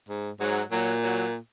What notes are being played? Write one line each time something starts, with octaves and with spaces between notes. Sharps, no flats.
G#2
G#2 F#3
A#2 F#3
F#3